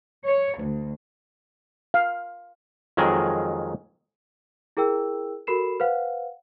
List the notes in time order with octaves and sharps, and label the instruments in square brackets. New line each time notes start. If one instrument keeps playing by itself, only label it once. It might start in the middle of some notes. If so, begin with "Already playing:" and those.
[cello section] C#5
D2
[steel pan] F5
[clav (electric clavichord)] F2 D#3 F#3 G#3 G#4 A#4
[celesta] E4 G#4 A#4 G5 E6
F#4 A4 A#4 B5 C7 E7
B4 C5 F5 F#5